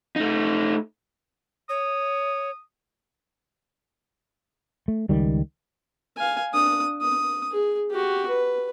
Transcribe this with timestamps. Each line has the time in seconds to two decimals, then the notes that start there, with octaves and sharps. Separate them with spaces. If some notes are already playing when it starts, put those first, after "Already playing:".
0.16 A3 D#4
1.70 C#5 D#6
4.88 A3
5.09 C#2 D#3 G3
6.17 F5 G#5
6.53 D4 D#6
7.02 D#6
7.52 G#4
7.91 F#4 G4
8.28 B4